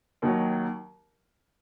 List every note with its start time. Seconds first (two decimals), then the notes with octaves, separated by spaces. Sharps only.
0.22 D#2 D#3 F#3